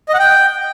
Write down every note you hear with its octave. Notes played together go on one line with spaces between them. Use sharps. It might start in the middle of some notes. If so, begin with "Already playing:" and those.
D#5
F#5
G5